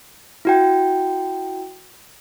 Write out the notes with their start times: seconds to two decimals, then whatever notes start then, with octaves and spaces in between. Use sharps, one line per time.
0.45 E4 F#4 G5